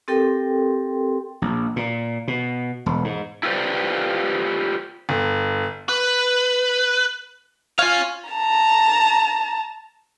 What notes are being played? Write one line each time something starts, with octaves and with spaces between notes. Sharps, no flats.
C4 G4 A4 A#4 G5 C6
A#1
A#2
B2
E1
G#2
E4 F4 G4 B4 C5 D5
G1
B4
F4 C#5 F5 G#5
A5 A#5